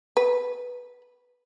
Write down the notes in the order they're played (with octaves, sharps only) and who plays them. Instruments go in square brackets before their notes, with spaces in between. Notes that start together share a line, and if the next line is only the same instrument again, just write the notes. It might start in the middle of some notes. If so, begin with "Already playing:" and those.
[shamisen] B4